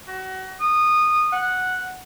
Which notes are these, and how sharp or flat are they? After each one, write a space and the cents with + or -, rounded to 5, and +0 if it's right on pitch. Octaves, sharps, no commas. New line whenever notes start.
F#4 +30
D#6 -20
F#5 -5